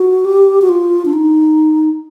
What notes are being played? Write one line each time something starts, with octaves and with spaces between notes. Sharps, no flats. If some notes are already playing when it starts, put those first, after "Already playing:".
Already playing: F#4
G4
F#4
F4
D4
D#4